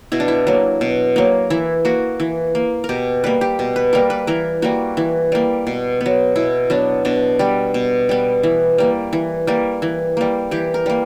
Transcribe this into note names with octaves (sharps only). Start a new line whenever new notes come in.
B2 E4
D4
E4
F#3 A#3
B2
F#3 A#3
E3 E4
A#3 F#4
E3
A#3
A#4
B2 G4
G3 A#3 B4
G4
B2
B4
G3 A#3 A#4
B4
E3 A#4
G3 A#3 F#4
E3
G3 A#3
B2
B3
F#3
B2 E4
F#3 B3 D4
B2 D4
G3 B3
B2
G3 B3
E3
G3 A#3
E3
G3 A#3
E3
G3 A#3
E3 G4
A#4
G3 A#3